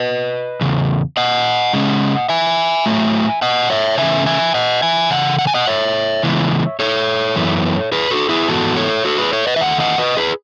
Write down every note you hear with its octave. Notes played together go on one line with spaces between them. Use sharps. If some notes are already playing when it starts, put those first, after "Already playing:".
Already playing: B4 D#5
E2 C#3
D#5 F#5
C#3 G#3 C#4
E5 G#5
A2 F#3 A3
D#5 F#5
C#5 E5
C#3 E3 A3 C#4 E5 G#5
E5 G#5
D#5 F#5
E5 G#5
C#3 E3 F#5
F#5
G#5
D#5 F#5
C#5 E5
C#3 E3 G#3 B3
A4 C#5
F#2 E3 B3
G#4 B4
F#4 A4
E4 G#4
G#2 E3 B3 F#4 A4
A4 C#5
F#4 A4
G#4 B4
A4 C#5
B4 D#5
E5
E2 D#3 A3 F#5
D#5 F#5
B4 D#5
G#4 B4